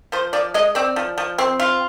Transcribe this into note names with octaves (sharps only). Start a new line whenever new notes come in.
F3 C5
F3 D5
G#3 D#5
C4 D5
F3
F3
C4
F4